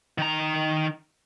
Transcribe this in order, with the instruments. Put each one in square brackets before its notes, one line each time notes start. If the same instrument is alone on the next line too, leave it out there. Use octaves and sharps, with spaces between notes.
[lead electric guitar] D#3 A#5